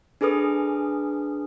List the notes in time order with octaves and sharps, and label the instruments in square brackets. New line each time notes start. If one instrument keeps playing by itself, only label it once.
[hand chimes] D4 G#4 A4 B4 D#6